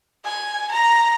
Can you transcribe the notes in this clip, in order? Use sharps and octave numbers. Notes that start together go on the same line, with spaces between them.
G#5
A#5